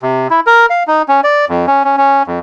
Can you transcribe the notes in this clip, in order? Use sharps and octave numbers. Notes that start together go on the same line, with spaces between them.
C3
E4
A#4
F5
D#4
C#4
D5
F2
C#4
C#4
C#4
F2